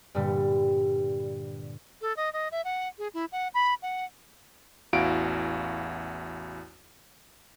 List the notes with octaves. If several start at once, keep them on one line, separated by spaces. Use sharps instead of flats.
G2 A#2 D3 G3
A4
D#5
D#5
E5
F#5
G#4
E4
F#5
B5
F#5
A1 E2 E4 F#4 F5 D7